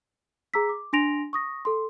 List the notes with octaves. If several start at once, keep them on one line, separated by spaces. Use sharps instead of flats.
G#4 A#5 D6 E6 B6
D6
D4 G#5 C6 A#6 D7 F7
C#6 D#6 A#6
A4 C6